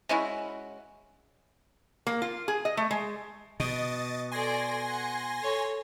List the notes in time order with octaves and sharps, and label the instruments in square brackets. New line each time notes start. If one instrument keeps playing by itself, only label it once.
[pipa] G#3 C#4 E4 F#4
[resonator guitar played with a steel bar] A#3
F4
G#4
D#5
A3
G#3
[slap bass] B2 [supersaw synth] D#5 A6
[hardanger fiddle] A4 D5 [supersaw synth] G#5 C6 A#6
[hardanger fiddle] F#5
A4 C#5